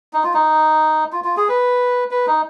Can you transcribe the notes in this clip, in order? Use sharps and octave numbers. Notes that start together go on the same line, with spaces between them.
D#4
F4
D#4
F4
F4
G#4
B4
B4
D#4